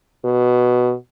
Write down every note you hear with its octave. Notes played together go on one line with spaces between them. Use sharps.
B2